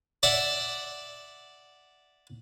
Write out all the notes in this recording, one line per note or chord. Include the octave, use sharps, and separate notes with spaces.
D5 E5 F#5